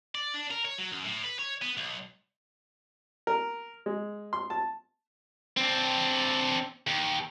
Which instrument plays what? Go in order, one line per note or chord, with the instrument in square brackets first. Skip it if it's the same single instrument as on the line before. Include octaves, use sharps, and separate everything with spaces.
[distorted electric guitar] D5
D4
A#4
C#5
F#3
F#2
A2
B4
C#5
B3
B1
[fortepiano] A#4
G#3
C6
A5
[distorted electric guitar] C4 D4
D#2